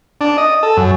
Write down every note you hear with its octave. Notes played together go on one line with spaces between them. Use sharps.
D4
D#5
A4
F#2